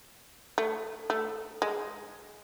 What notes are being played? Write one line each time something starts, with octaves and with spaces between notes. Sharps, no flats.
A3
A3
G#3